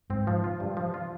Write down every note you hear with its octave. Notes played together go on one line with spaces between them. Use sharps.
G#2 C4
F3
F4
G2
F3
F4